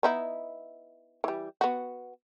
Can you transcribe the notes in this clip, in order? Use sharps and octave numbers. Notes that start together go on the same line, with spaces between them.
B3 D#4 E4
E3 G3
B3 F#4